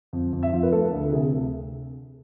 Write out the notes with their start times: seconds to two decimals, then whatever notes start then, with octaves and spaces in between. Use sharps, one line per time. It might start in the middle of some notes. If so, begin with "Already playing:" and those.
0.13 F2
0.33 F2
0.43 E5
0.53 F3
0.63 B4
0.72 A3 A4
0.92 D2
1.12 C3 G#4